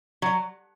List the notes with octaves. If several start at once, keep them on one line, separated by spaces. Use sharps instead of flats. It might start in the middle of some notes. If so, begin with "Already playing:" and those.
F#3